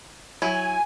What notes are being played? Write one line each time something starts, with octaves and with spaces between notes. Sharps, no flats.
F#3 E4 G#5